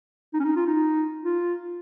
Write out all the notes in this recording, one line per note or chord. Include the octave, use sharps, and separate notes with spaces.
D#4
C#4
D#4
F4
D#4
F4